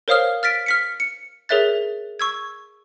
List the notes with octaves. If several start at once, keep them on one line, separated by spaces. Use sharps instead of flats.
A#4 C5 C#5 F5 D#6 F6
F6 A6 B6 D7
F6 B6 C#7
C#7
G#4 A#4 C#5 E5 F#6 A6
C#6 E6 G#6